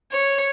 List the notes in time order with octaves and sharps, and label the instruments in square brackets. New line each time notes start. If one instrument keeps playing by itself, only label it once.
[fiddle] C#5